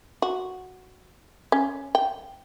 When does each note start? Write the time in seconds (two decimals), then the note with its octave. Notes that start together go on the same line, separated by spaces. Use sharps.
0.22 F#4
1.52 C#4
1.95 G5